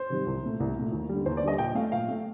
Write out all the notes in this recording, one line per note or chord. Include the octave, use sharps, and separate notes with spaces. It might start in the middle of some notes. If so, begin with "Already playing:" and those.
Already playing: C5
C3 D#3 G3
C2
A#2 A3
C2
A#2 A3
D#2
D3 G3
D#2 C5
D5
D3 G3 D#5
A#2 G5
A3 F5
A#2 F5
A3